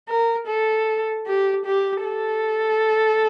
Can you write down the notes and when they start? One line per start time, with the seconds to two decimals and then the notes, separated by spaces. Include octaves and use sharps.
0.08 A#4
0.47 A4
1.26 G4
1.66 G4
2.04 A4